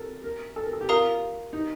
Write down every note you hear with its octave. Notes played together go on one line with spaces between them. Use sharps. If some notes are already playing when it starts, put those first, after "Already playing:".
Already playing: A4 A#4
A#4
A4
A#4
A4
G4
F4 A#4 F5 A#5 D#6
D#4